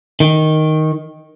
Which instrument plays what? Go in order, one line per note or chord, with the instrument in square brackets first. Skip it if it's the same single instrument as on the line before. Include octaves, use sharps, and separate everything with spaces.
[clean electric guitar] D#3